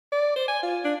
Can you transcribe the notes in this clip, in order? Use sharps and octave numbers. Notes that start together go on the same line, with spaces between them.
D5
C5
G#5
F4
D4